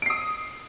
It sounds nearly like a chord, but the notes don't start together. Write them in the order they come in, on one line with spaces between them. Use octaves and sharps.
D7 C7 D#6